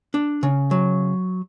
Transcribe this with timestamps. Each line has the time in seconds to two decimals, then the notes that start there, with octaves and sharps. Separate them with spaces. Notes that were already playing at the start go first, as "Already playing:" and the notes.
0.14 D4
0.43 C#3
0.71 F#3